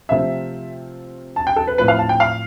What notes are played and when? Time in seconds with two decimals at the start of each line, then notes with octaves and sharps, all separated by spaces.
0.09 C3 F3 A3 C4 F4 E5
1.36 A5
1.47 G5
1.56 A4
1.67 B4
1.78 A2 F3 C4 B4
1.88 F5
1.99 A5
2.09 G5
2.20 F5